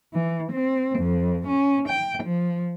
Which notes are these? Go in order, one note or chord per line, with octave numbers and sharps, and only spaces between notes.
E3
C4
F2
C#4
G5
F3